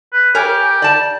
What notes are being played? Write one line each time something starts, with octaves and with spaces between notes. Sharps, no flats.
B4
G4 A#4 C#5 G#5
D5 A5